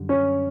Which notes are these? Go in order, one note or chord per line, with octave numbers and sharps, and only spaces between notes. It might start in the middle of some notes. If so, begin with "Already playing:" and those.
Already playing: F#2 D3 G3
C#4